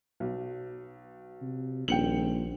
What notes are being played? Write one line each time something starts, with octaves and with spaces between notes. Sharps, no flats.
B1
C3
D#1 A#1 G5 C#7 F#7